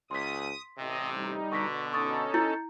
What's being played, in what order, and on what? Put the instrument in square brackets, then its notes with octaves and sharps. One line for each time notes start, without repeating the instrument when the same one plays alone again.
[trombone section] C#2 [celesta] C6 B6 [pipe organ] D#6
[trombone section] A1 C3 [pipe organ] D#5
[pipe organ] G3 D#4
[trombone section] B2 D3 [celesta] C#6 A#6 B6
[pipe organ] C#4 D#4 A4 [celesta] C#6 D#6 A6
[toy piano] E4 [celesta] G6 A6 C#7